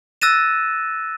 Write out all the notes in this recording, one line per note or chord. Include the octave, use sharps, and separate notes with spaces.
E6 F#6 A6 A#6 D#7 E7